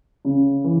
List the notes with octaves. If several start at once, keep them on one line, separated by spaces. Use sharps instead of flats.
C#3
E3